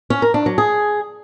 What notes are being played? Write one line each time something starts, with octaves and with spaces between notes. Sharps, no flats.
C#4
A#4
D4
F#3
G#4